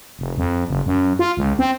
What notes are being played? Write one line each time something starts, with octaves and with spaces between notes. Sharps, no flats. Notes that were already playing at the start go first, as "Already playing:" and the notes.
F1
F2
F#1
F#2
F4
C#2
C4